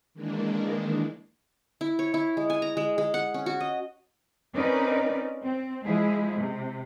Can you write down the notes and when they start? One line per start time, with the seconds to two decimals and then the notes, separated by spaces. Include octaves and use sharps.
0.14 D#3 E3 G#3 A#3 D4
1.81 E4
1.99 C#5
2.14 E4
2.37 G#3
2.50 G#5
2.62 A#5
2.77 G#3
2.98 G#3
3.14 F#5
3.34 C#4
3.46 F#4
3.60 D#5
4.55 C4 C#4 D#4 A#4 B4 D5
5.43 C4
5.83 F3 G#3 E4 G#4
6.38 C3